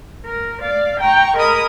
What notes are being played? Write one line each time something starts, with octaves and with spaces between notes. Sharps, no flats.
A#4
D5 F5
G5 A#5 C#6
G#4 A#4 D#5 B5 D#6